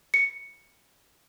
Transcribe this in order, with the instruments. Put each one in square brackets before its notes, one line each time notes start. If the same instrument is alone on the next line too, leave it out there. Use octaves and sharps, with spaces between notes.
[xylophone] C#7